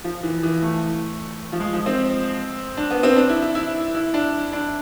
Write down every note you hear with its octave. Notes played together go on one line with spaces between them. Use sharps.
F3
E3
E3
A3
F3
G#3
F3
C4
D4
B3
C4
D4
E4
E4
E4
E4
D4
D4